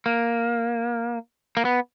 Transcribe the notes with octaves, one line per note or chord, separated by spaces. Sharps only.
A#3
A#3
B3